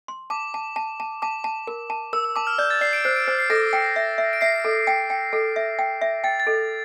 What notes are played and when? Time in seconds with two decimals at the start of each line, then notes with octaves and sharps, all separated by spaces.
0.08 C6
0.30 A5 D6
0.54 A5
0.76 A5
1.00 A5
1.22 A5 D6
1.44 A5
1.67 A#4
1.90 A5
2.13 A#4 E6
2.25 E6
2.36 A5 D6
2.47 F6
2.58 D5 G6
2.70 A6
2.81 D5 C7
2.93 D7
3.04 C5 C7
3.16 D7
3.27 C5 C7
3.39 C7
3.50 A4 A#6
3.73 G5
3.96 E5
4.18 E5
4.33 D7
4.41 E5 C7
4.65 A4
4.87 G5
5.10 G5
5.33 A4
5.56 E5
5.79 G5
6.01 E5
6.24 G5 A6
6.40 A6
6.47 A4